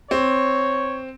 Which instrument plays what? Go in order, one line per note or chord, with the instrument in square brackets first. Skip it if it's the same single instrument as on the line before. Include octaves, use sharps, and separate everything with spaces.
[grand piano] C4 [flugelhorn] C#5